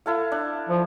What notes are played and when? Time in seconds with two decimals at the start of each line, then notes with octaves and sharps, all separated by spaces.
0.06 E4 A4 F5
0.32 D4
0.69 F3